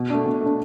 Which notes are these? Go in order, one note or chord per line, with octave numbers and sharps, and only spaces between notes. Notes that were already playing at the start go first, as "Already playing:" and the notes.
Already playing: B2
A3 D4
B2
A3 D4